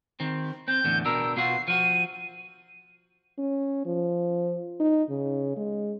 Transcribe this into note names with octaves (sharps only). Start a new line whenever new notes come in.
D#3 C4
C4 G6
E2 A2 D3
B2 D4 A#4 E6
B2 F4 F#4 C7
F3 F#4 D#7
C#4
F3
D#4
C#3
G#3